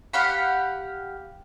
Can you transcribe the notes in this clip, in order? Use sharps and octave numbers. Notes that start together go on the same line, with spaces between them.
G4 F5 F#5 B5